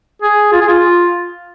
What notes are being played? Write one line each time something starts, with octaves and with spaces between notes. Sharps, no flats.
G#4
F4
G#4
F4